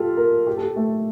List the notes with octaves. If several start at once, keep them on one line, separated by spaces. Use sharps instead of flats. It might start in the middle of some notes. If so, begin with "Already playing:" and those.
Already playing: F4 G4 A4
A#4
G4
A4
G4
A3